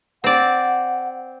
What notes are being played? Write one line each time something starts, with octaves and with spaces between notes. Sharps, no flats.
C4 D5 F#5